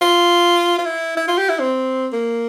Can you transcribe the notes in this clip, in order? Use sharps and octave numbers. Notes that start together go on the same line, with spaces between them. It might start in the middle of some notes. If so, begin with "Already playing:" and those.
F4
F4
E4
E4
F4
G4
E4
C4
A#3